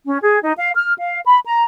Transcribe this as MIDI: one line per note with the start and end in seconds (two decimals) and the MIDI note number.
0.07 0.19 61
0.22 0.38 68
0.44 0.54 63
0.58 0.70 77
0.76 0.93 89
0.98 1.20 77
1.26 1.38 83
1.46 1.64 82